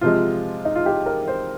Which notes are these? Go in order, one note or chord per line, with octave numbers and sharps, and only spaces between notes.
C3 F3 G#3 F4
D#4
F4
G4
A#4
C5